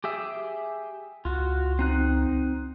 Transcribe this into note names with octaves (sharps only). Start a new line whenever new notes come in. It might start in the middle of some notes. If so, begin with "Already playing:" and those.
G4 G#4 E5
C#2 F4 F#4
C4 D#4 F#6